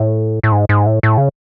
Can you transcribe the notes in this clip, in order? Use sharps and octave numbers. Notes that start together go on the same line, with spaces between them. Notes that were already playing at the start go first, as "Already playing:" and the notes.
Already playing: A2
A2
G#2
G#2
A2
A2
C#3